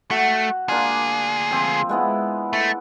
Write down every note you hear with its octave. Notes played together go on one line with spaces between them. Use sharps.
A3 F#4
D2 A#3 D4 F4 G#4
F3 C4
G#3 B3 E4
A3